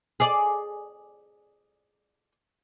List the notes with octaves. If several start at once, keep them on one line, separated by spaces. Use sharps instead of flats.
G#4 D5